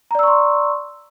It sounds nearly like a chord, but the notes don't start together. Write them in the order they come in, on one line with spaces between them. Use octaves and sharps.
A#5 D5 E6 C#6 C6